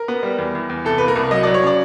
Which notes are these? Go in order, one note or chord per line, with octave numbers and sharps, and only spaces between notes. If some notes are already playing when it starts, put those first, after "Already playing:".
Already playing: A#4
B3
G3
E2
E2
E2
C2 A4
A#3 B4
A#4
C2
F#3 D#5
F#3 D5
C#5
C#3 D5